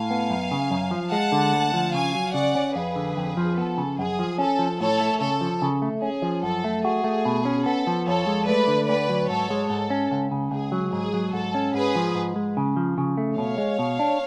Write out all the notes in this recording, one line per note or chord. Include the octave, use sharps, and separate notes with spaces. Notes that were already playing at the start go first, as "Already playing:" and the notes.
Already playing: A2 F5 G#5
B3
F#2
C#3
F#2
F3
G#3 F#5 A5
D3
D2
F3
C#3 F5 G#5
F#3
C#3 D5 F#5
C#4
F2 G#4 B4
D3
F2
F3
B3 A4
C#3
F#2 G#4
F3
C#4 A4
F3
A2 A4 C#5
A3
C#3 A4
F3
C#3
A3
C#4 G#4
F3
F#2 A4
A3
F#4 G#4
A3
B2
C#4
B3 A4
F3
F2 A4 C#5
G#3
A3 B4 D5
D3
D2 B4 D5
F#3
G#2 A4 C#5
G#3
G#2 A4
C#4
C#2
C#3
C#2 G#4
F#3
G#2 G#4
F#3
G#2 A4
C#4
G#2 G#4 B4
F3
G#2
G#3
C#3
F3
C#3
A3
B2 C#5 F5
G#3
B2
D4